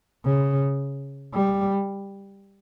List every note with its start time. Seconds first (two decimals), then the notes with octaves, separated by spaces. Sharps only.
0.25 C#3
1.34 G3